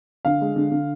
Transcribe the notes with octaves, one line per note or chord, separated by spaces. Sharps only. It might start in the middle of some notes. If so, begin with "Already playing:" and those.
D3 F5
G#3
D3
D3